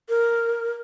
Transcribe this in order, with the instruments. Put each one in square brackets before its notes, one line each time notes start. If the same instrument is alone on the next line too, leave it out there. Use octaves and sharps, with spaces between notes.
[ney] A#4